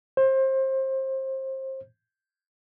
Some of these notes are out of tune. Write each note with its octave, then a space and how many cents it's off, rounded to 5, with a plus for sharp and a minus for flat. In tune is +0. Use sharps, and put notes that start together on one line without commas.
C5 +25